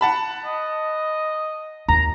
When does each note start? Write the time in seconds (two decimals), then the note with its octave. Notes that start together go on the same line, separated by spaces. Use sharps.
0.01 F#5 A5 B5
0.45 D#5
1.88 D#2 A#5